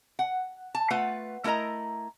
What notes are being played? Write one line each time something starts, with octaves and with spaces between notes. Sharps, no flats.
F#5
A5
A3 F4 B4 F#5
A3 E4 A#4 D#5 A#5